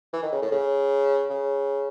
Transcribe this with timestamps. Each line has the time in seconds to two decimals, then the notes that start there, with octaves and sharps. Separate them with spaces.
0.13 E3
0.23 D#3
0.32 C#3
0.42 A2
0.52 C#3
1.30 C#3